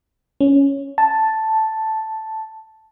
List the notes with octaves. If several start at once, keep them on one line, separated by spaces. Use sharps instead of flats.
C#4
A5